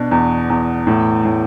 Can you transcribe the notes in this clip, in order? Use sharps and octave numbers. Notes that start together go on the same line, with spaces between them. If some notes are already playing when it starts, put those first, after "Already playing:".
Already playing: B2 D4
E2
E2
A2
A2